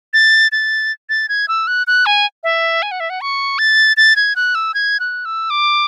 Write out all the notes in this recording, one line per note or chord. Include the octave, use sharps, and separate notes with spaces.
A6
A6
A6
G#6
E6
F#6
F#6
G#5
E5
G#5
F#5
E5
F#5
C#6
A6
A6
G#6
F#6
E6
G#6
F#6
E6
D6